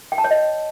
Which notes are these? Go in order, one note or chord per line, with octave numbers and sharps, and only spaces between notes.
G5
A5
C#5
D#5